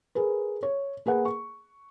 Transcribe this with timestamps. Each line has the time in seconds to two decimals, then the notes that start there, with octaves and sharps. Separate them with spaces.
0.15 G#4 A#4 B4
0.63 C#5
1.06 A#3 G#4 B4 F#5
1.25 C#6